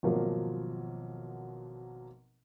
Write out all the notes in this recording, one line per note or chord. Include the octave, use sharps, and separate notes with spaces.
G#1 B2 F3 F#3 A#3 A#4